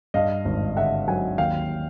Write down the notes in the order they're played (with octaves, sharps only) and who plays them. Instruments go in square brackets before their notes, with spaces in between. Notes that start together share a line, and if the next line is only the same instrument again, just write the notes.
[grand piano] G2 D#5 F5
G#1
D3 E5 F#5
F#3 F#5 G#5
D#2 F5 G5